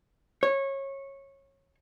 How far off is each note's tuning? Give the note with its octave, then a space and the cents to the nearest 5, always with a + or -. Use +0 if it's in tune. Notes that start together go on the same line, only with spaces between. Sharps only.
C#5 -20